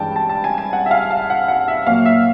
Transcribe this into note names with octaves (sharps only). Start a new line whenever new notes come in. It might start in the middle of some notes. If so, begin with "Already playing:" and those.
Already playing: G2 E3 G#3 C#4 G5 A5
A5
A5
G#5
G#5
F#5
E5
F5
F5
F#5
F#5
E5
A#2 F#3 A#3 F5
E5